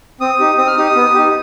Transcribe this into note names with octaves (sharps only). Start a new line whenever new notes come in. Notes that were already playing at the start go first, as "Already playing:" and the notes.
C4 D#6
D#4 G4
C4 D#6
F6
D#4 G4 D#6
B3
D#4 G4